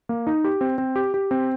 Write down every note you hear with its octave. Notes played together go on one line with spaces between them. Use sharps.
A#3
D#4
G4
C4
C4
G4
G4
C4